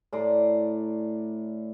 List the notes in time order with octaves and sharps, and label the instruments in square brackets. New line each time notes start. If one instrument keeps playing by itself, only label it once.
[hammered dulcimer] A2 D5 A#5 C6